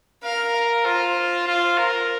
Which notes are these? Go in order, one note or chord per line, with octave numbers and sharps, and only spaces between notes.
A#4 F5
F4 C5
F4
A#4